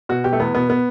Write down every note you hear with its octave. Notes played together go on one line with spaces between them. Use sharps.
B2 F#4
B2 G4
A3
E2 B3
B2 B3
B3